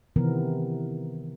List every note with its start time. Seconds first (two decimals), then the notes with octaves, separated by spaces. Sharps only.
0.16 C3 D#3 E3 B3 C4 A#4